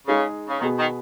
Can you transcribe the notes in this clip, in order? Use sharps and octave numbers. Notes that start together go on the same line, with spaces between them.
C#3 G#3 D#4 G#4
C#3
B2 D#3 B3 G#4
D#3